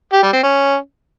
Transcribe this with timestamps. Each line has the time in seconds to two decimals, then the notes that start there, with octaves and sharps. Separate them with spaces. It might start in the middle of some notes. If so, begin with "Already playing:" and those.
0.13 G4
0.23 G3
0.33 C4
0.43 C#4